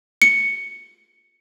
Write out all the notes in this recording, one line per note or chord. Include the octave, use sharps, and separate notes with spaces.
C#7